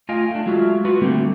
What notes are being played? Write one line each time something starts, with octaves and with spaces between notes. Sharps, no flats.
A3 F4 D#5 F5 G5 G#5
A3 D4
F#3 G#3 F4 F#4 E5
F4 F#4 B4 F#5
D3 G3 A3 A#3 C4